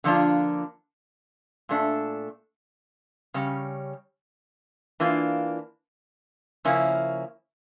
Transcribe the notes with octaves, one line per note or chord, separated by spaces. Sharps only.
D3 F3 A#3 D4 F4
A#2 A3 D4
C#3 G3 C#4
E3 A#3 D4 F4
C#3 F3 A#3 C#4 E4